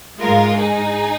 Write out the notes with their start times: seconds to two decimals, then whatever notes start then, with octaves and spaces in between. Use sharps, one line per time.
0.19 G#2 G#3 F4 A#4
0.55 D#4 G#4